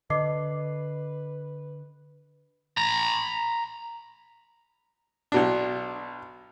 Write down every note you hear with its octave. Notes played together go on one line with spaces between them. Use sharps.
D3 B4 D#5 D6 C7
A#5 B5
B1 B2 D4